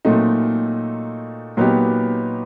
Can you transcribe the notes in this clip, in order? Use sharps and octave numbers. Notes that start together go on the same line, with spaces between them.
A#2 F#3 A3 C4 D#4
A#2 F#3 B3 D#4 G4